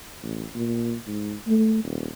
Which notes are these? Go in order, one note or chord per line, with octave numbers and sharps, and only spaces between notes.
A1
A#2
G#2
A3
D#1